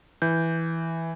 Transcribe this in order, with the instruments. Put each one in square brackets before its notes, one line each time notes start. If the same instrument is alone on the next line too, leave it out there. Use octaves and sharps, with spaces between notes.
[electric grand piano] E3 G6